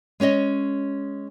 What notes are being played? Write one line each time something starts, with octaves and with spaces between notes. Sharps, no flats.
G#3 C#4 C#5 D#5